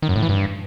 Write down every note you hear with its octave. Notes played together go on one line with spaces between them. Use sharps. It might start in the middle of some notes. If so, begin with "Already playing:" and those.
D#3
F#2
A2
E3
G2